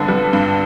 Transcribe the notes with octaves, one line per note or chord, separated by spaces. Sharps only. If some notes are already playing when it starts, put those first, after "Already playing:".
Already playing: G2 D3 B3
G3
G2